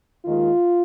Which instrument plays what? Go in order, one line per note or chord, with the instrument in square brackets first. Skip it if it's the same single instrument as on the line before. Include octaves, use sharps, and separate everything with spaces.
[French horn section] D#2 D#3 G#3 F4